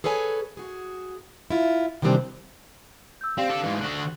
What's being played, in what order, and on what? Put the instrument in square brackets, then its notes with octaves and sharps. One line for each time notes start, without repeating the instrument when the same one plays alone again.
[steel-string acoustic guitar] G#4 A4 B4 C#5 G#5
F#4 G#4
E4 F4
C3 D#3 E3 G3 C4 D4
[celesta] E6 G6
[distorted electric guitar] C4 [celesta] G4 D5 F5
[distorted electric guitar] D4 A4
G#2 E3
[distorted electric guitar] D3 F#4 [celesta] F#6